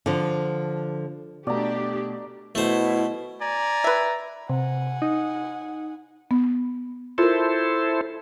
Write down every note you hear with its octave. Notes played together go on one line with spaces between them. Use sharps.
D3 F3
B2 A3 D4 G4 D5 A#5
B2 A3 E4 C5
D5 G#5 A#5
B4 E5
C3 F#5 G#5
D#4
B3
E4 F4 A4 A#4 C5